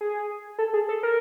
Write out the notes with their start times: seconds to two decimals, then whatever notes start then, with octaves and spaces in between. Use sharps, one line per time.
0.01 G#4
0.59 A4
0.73 G#4
0.89 A4
1.03 A#4